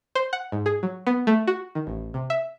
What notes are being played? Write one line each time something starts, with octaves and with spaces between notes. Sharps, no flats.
C5
F#5
G#2
G#4
F#3
B3
A3
F#4
D#3
A1
C3
E5